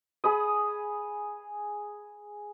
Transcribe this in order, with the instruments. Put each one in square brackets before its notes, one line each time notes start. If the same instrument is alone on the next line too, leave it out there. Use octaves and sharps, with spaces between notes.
[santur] G#4 B5 D#6